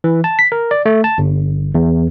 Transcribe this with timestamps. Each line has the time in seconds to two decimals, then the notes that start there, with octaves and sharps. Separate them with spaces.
0.04 E3
0.24 A5
0.39 B6
0.52 A#4
0.71 D5
0.86 A3
1.04 A5
1.18 G1
1.75 E2